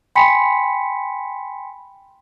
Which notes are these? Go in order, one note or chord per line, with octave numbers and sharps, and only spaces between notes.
G5 G#5 B5 C6 B6 C#7